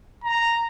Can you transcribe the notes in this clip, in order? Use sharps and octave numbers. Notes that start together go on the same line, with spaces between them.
A#5